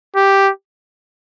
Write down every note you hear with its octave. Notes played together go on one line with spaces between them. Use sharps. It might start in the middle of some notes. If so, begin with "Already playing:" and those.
G4